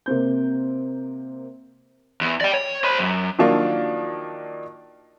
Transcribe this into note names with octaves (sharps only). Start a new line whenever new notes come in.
C3 A#3 C4 G6
E2
D5 G5
C#5
C5 B5
F#2
D#3 F3 F#3 A#3 D4 F4